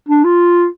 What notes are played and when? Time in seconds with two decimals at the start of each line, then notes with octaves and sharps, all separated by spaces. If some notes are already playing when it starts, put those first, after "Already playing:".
0.08 D4
0.24 F4